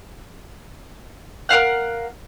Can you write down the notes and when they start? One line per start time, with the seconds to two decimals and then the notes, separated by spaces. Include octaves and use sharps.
1.49 A#4 B4 F5 F#5